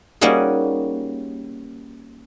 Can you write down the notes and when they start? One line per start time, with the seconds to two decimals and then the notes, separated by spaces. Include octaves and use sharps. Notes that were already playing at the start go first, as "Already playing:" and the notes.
0.21 G3 A#3 C#4 D#4 F#4 G#4